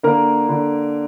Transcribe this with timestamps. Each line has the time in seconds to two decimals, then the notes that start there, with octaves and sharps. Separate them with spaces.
0.03 D3 A#3 A#4
0.49 D3